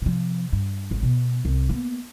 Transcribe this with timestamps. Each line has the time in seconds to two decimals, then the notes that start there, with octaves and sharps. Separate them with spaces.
0.02 C3 F3
0.52 G2
0.90 G#1 D2
1.03 B2 B3
1.45 C2
1.69 A#3 B3